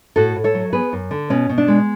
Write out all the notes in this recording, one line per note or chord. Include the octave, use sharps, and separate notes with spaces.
A2 F#4 A4
A2
A4 C#5
F#3
B3 G#4 B4
F#2
D3
B2 C#4
B2
D4
G#3